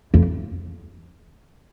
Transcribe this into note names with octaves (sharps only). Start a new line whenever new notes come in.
F2